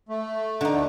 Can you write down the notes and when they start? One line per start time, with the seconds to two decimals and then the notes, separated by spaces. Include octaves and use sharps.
0.09 A3
0.61 D3 D#4
0.73 D2 A3